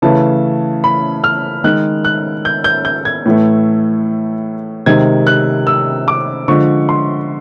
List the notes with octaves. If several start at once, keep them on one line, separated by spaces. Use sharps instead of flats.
C#3 E3 A3 A5
B5
F6
D#3 G#3 F#6
F#6
G6
G6
G6
G#6
A2 E3 A3
C3 D#3 G#3 G#6
F#6
E6
D6
D3 F3 G#3 C#6
C6